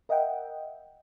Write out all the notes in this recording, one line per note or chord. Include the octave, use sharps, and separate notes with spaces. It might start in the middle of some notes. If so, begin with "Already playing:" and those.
A#4 D#5 E5 F#5 G5